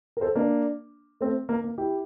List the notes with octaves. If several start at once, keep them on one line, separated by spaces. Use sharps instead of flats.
A#4
A4 C5
A#3 D4
A3 C4
A#3
A#3
E4 G4